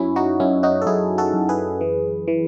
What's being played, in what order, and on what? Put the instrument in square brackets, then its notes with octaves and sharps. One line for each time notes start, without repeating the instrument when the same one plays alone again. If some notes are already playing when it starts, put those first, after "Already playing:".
Already playing: [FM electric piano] F#2 C#4 E4
D#4 F#4
F#2 C#4 E4
D#4 F#4
A4
F#2 E4 G#4
F#4 A4
F#2
G#4 B4
E3
E3